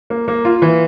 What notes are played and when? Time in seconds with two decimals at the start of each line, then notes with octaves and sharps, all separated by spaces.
0.10 A#3
0.28 A#3
0.45 F4
0.62 E3